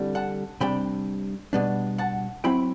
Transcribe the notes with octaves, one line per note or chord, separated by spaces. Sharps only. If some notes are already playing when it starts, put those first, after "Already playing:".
Already playing: D3 G3 C4 E4
F#5 A5
C3 G3 D4 G5 B5
B2 G3 B3 D4
F#5 A5
F#3 C4 E4 G5 B5